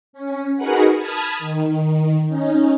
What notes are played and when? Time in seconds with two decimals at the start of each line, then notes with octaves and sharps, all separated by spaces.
0.13 C#4
0.56 D#4 F#4 G#4 A#4 B4 F#5
0.97 A5 B5 D#6 F6 G#6
1.39 D#3
2.26 C#4 D#4